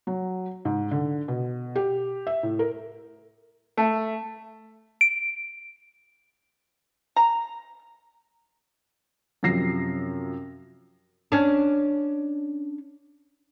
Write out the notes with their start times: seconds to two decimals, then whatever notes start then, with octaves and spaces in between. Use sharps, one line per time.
0.07 F#3
0.65 G#2
0.91 D3
1.28 B2
1.75 G4
2.27 E5
2.43 A2
2.59 A#4
3.77 A3
5.01 D7
7.16 A#5
9.43 F#2 C3 F3 A#6 C7
11.32 C#4 D4